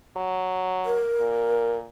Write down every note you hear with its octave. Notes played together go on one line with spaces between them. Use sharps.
F#3
A#4
A#2